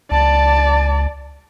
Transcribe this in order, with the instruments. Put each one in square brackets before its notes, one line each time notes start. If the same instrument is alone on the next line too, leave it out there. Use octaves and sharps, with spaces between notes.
[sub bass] C#2 [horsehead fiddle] D5 A5